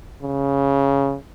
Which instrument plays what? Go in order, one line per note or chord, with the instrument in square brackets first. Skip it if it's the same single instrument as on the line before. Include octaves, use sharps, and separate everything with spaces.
[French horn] C#3